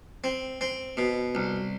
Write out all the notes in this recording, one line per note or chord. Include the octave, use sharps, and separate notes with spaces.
C4
C4
B2
C2